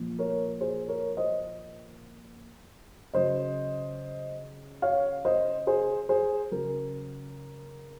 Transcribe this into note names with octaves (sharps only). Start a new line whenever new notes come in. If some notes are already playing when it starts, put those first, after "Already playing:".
Already playing: A#2 F3
A#4 C#5
G#4 C5
A#4 C#5
C5 D#5
C#3 F#3 C5 D#5
C#5 F5
C5 D#5
G#4 C5
G#4 C5
C#3 F#3 A#4